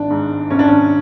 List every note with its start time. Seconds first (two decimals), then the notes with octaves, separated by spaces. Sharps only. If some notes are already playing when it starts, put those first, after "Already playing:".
Already playing: G#1 D4
0.10 G#2
0.50 G#1 C#4
0.59 D4
0.68 C#4